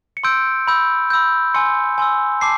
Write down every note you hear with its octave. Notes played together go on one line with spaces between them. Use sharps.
C#7
C6 E6 G6 D7
B5 E6 G6
B5 E6 G6
G#5 C6 E6 C#7
G#5 C6 E6
A5 D6 C7